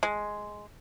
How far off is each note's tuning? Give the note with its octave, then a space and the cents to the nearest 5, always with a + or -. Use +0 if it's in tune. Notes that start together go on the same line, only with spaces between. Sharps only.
G#3 +5